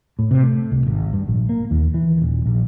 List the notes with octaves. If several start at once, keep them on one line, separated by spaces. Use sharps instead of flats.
A2
C3
A3
C2
G#1
G2
A#1
A#3
D#2
E3
D#1
A#1